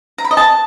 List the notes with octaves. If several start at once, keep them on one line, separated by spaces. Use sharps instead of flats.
A#5
B5
D#5
A5